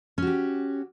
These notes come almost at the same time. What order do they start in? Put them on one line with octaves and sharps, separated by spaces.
C#4 F#4 G4